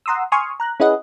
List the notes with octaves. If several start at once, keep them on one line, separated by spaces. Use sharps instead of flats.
F#5 A#5 C6 D#6 E6
G#5 C6 C#6 D#6 F6
A#5 F#6
C#4 E4 G#4 B4 D#5 F#5